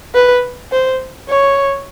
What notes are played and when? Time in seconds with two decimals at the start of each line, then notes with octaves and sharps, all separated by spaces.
0.14 B4
0.72 C5
1.28 C#5